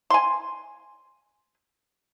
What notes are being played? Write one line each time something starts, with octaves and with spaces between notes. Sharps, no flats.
G#5 C6